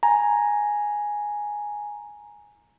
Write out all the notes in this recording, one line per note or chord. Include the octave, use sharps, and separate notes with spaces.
G#5 A#5